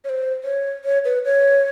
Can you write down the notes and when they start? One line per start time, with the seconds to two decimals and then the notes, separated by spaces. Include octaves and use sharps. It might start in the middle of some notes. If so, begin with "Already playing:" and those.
0.04 C#5
0.09 C5
0.44 C#5
0.85 C#5
1.05 B4
1.24 C#5